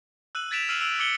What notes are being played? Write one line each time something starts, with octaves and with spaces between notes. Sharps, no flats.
E6 F#6 D#7 F#7
G#6 A6 B6 D7 E7 F7
E6 F6 C7 D#7 F#7
E6 D7 F7 F#7
D6 E6 G#6 C#7 F#7 G7